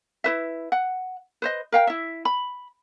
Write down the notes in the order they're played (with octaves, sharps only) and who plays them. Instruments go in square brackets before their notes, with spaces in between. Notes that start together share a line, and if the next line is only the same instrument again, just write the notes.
[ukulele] E4 B4 E5
F#5
B4 C5 D#5
A#4 F5 G5
E4 E5
B5